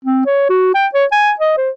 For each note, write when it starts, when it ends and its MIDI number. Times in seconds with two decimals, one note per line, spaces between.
0.05 0.22 60
0.26 0.45 73
0.49 0.74 66
0.75 0.87 79
0.94 1.05 73
1.12 1.32 80
1.39 1.55 75
1.57 1.70 72